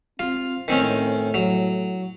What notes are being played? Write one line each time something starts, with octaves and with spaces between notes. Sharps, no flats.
C4 F4
A2 D#3 C4 C#4
F#3